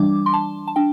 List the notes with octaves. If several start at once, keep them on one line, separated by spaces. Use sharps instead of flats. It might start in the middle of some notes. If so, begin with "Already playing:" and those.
Already playing: E3 G3 D4 D6
C6
A5
A5
D4 G5